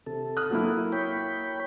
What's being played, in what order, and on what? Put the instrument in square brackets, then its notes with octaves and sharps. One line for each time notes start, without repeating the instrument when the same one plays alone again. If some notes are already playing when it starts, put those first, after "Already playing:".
[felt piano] C3 [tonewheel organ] A4
[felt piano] D#6 F6 F#6
F#3 A#3 E4
[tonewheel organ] C#5 G5 B5